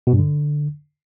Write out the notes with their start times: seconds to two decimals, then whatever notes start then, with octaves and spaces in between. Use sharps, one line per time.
0.07 B2
0.13 G2
0.19 D3